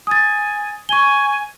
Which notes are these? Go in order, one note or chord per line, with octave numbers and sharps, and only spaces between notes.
G#5 D#6 A6
G#5 C#6 G7